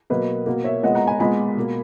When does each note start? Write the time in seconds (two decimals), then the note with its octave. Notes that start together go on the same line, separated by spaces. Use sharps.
0.10 B2 F#3 A#3 B4 D#5
0.46 B2 A#3
0.64 C#5 E5
0.83 A#2 G#3 B3 D#5 F#5
0.95 F#5 A#5
1.07 G#5 B5
1.19 A#2 G#3 B3 G#5 B5
1.57 B2 A#3